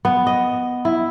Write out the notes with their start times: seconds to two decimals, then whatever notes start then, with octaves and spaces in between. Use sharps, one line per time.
0.05 B3
0.27 D#5
0.85 E4